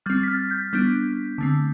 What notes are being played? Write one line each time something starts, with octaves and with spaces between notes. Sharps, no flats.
G3 C4 F6 A6
B6
F6 A6
G6 B6
G3 B3 D4
D3 A3 C4